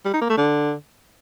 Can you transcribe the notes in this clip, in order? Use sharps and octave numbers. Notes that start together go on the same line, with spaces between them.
G3
D#4
A#3
A3
D3